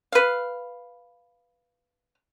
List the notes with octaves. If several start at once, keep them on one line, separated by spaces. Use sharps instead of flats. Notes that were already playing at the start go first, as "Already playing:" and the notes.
B4 F5